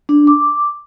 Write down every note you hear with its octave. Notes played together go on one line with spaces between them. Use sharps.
D4
D6